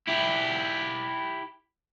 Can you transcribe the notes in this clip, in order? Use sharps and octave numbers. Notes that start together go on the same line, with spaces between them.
E4 G4